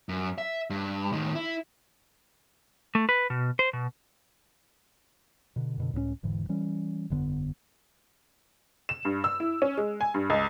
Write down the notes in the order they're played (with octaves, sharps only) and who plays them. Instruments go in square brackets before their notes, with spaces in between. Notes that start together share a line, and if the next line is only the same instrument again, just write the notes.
[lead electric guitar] F#2
E5
G2
A2 D#3
E4
[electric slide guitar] A3
B4
B2
C5
B2
[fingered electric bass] B2 D3
F#2 B2 D3
C#2 A2 G#3 C#4
E1 G#2 D3 E3
E3 G3 C#4
G1 F2 D3 B3
[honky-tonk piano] E7
G2
E6
E4
C#4
G#3
G#5
G2
C#2